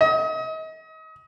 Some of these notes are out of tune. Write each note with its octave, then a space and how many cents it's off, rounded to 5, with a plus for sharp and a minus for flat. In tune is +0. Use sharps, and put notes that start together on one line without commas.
D#5 +35